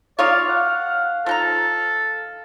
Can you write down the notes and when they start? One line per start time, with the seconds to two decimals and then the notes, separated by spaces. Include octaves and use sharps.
0.19 D#4 F4 C#5 D5 F5
0.49 F#5
1.26 F3 D#4 A4 A#5